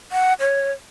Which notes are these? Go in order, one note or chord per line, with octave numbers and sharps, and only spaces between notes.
F#5
C#5